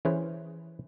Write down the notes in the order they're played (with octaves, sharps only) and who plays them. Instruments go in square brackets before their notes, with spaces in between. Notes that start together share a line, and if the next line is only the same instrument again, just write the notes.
[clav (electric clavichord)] E3 C#4 G#4 B4 C5